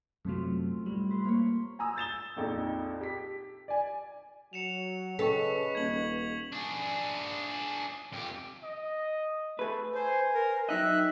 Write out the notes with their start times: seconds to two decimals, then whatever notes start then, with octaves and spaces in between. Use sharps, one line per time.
0.25 F#2 C3 F#3 A3 C4 F4
0.86 A2 G3
1.10 B4 C5
1.25 A#3 C#5
1.79 G#5 A#5 D#6 E6
1.96 G6 A6 E7 G7
2.36 A#1 F2 D#4
3.01 G4 B6
3.68 D5 G#5
4.53 F#3 C#7 E7 F7
5.19 C#3 A4 B4 D#5 C#6 B6
5.75 D#1 G#6 F#7
6.53 D4 G#4
8.12 F2 G4
8.64 D#5
9.59 A3 G#4 B4
9.95 C5 G#5
10.34 A#4
10.69 F#3 D#4 D#5 E5 G5 F#6